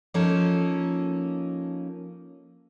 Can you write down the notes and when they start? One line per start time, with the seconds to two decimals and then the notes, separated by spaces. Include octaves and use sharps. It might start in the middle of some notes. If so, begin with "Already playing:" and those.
0.14 F3 A#3 C#4 D#4 A4